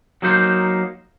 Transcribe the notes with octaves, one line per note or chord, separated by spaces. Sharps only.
F#3 A#3 D#4 C5